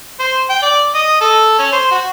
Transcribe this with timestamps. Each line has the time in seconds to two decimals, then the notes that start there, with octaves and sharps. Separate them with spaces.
0.19 C5
0.49 G5
0.62 D5
0.94 D#5
1.21 A4
1.58 C#4
1.72 C5
1.91 F#4